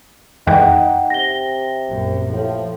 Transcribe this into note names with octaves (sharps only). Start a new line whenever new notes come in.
F2 E3 G#3 D#4 F#5 G5
C3 A#6 G7
A#1 F#2
A2 F3